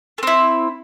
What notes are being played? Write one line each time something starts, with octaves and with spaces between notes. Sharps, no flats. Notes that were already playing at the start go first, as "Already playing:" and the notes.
A3 C4 E4